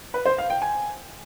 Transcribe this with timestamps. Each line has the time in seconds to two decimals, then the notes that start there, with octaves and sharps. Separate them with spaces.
0.14 B4
0.26 C5
0.38 F5
0.50 G5
0.62 G#5